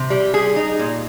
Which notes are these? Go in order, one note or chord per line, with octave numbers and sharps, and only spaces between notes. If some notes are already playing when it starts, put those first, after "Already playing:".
Already playing: C3
G3
G#4
D#4
A#2